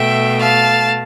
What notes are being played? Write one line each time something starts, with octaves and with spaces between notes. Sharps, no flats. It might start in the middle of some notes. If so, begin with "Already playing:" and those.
Already playing: B2 A3 E5 G5
F5 A5